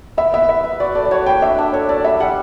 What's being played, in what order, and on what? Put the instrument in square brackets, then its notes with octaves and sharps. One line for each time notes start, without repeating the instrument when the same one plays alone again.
[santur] B4 [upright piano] E5
[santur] B3 [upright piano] E5
[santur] B4 [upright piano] E5
[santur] B4
[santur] F#4 [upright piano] D5
[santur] A3 [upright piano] D5
[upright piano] D5
[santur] F#4 [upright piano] C#5
[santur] B4 [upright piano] G5
[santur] D4 [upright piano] E5
[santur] D4
[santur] A4 [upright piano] C#5
[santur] A4 [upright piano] D5
[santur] G3 [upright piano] E5
[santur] G3 [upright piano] F#5